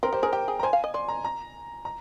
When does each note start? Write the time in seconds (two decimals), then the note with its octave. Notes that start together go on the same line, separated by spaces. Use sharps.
0.03 C4 A#4
0.13 G4 C5
0.23 G#4 A#4
0.32 G4 G5
0.48 G#4
0.59 A#5
0.63 C5 G#5
0.73 F5
0.84 D#5
0.94 D5 C6
1.08 A#5
1.24 A#5
1.85 A#5